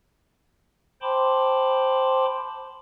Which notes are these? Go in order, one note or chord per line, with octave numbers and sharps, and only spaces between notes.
C5 G5 A5 B5 C6 D6